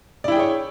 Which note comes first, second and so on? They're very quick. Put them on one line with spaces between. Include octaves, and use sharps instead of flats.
D5 E4 G5 G#4 C#5